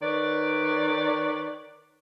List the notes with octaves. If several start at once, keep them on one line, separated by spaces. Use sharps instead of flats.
D#3 B4 C#5 D5